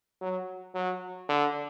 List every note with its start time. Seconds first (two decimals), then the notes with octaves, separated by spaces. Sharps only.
0.21 F#3
0.75 F#3
1.29 D3